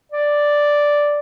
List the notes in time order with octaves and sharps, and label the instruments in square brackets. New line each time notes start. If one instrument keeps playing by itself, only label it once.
[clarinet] D5